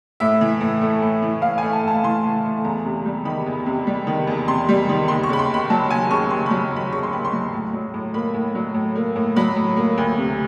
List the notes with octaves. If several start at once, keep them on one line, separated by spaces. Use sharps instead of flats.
A2 E5
E3
A2
A3
A2
E3
A2 F5
G#5
A3
A5
A2 A5
E3 C6
A2
A3
E2 A#5
C3
G3
D#3 B5
E2
C3
G3
D#3
E2
C3 C6
G3
D#3
D#2 C6
C#6
C#3 B5
C6
D#2 B5
F#3 A5
D#2 G#5
C#3 C#6
D#2 C6
B5
F#3
D#2 B5
C#3 C#6
C6
D#2 B5
C6
F#3
A2
F#3
A2
A#3 B5
A2
F#3
A2
A#3
A2
F#3 B5
A2
A#3
D2
C3